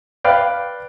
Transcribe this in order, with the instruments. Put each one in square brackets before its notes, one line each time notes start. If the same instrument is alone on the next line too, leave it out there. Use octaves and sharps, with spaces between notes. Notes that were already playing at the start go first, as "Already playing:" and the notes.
[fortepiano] B4 D5 F5 G5